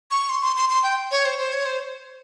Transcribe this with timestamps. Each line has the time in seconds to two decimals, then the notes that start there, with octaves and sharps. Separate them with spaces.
0.11 C#6
0.30 C6
0.42 C6
0.57 C6
0.70 C6
0.83 G5
1.11 C#5
1.25 C5
1.38 C5
1.53 C#5
1.66 C5